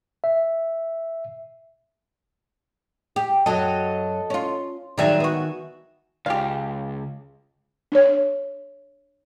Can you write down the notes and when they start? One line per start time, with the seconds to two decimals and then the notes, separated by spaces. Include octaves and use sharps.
0.24 E5
3.16 G4
3.46 F#2 F#3 A4 D#5
4.30 C#4 F4
4.98 G#2 D#3 F#3 G3 E5 G#5
5.20 B3 F#4
6.26 C#2 G4 F5
7.92 D4 C#5